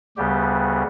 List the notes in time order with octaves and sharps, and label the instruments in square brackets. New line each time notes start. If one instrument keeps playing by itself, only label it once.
[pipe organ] D2 C#3 G3 B3 G4